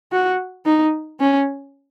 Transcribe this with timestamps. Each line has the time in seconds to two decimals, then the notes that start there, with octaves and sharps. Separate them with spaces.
0.12 F#4
0.66 D#4
1.20 C#4